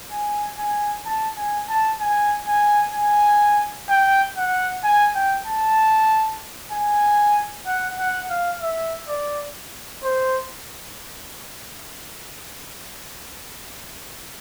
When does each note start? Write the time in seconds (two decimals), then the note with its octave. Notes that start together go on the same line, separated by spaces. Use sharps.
0.12 G#5
0.59 G#5
1.06 A5
1.37 G#5
1.69 A5
2.01 G#5
2.48 G#5
2.94 G#5
3.89 G5
4.37 F#5
4.84 G#5
5.16 G5
5.46 A5
6.72 G#5
7.67 F#5
7.99 F#5
8.30 F5
8.62 E5
9.08 D5
10.04 C5